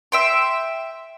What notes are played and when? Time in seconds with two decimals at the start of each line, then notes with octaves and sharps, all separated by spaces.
0.12 E5 G5 C6